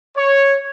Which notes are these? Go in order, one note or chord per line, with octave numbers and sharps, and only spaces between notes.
C#5